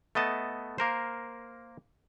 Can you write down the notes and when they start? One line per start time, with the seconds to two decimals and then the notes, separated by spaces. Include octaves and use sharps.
0.15 A3 B3 D#5 A5
0.78 A#3 A#4 C5